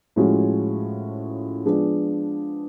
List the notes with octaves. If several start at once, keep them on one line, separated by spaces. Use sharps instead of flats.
A2 F3 G#3 C#4 F#4
F3 G#3 B3 D4 G#4